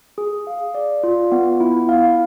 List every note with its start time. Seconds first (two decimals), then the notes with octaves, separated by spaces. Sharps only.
0.18 G#4
0.47 F5
0.75 D5
1.03 F4
1.32 B3
1.60 E4
1.89 F5